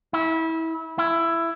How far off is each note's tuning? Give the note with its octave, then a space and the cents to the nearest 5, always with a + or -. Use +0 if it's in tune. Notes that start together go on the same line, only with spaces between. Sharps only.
E4 -25
E4 +15